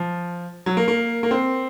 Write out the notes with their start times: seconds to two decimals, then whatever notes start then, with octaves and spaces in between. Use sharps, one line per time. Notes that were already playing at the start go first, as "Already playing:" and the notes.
Already playing: F3
0.66 F#3
0.77 A#3
0.88 A#3
1.23 A#3
1.31 C4